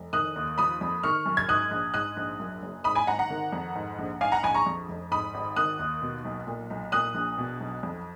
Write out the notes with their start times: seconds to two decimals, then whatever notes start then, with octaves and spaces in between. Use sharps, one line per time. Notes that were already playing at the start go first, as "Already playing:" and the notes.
Already playing: F1
0.13 D#3 D#6 F#6
0.36 D#2
0.58 F3 B5 D#6
0.81 F2
1.03 D#3 C#6 F6
1.26 F#2
1.37 G#6
1.48 G#2 D#6 F#6
1.71 A#1
1.94 G#2 D#6 F#6
2.17 A#1
2.39 F#2
2.62 F#1
2.84 G#2 B5 D#6
2.95 G#5 B5
3.07 G#1 F#5 A#5
3.19 F#5 A#5
3.30 D#3
3.53 F2
3.75 G#2
3.99 A#1
4.21 G#2 F5 G#5
4.32 F#5 A#5
4.43 A#1 G#5 B5
4.54 A#5 C#6
4.66 F2
4.89 F1
5.11 G#2 B5 D#6
5.34 G#1
5.56 D#3 D#6 F#6
5.79 D#2
6.02 B2
6.25 B1
6.47 A#2
6.70 B1
6.92 A#2 D#6 F#6
7.15 A#1
7.38 B2
7.60 B1
7.83 F2